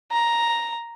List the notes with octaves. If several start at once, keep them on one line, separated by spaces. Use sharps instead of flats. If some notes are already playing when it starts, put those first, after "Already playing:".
A#5